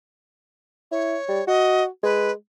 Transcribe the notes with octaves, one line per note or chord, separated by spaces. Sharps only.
E4 C#5
G3
F#4 D#5
G#3 B4